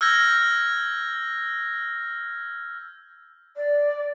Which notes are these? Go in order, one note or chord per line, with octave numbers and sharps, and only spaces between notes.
E6 F6 G6 G#6 A#6
D5